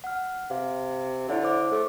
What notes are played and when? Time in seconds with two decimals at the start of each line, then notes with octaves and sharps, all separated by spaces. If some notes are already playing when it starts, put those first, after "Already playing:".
0.04 F#5 F6
0.50 C3 F5
1.29 D3 E4 C#5 E5
1.43 C5 D6
1.72 A3